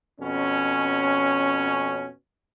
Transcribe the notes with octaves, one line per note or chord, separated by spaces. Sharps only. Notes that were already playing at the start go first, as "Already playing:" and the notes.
F2 B2 C#4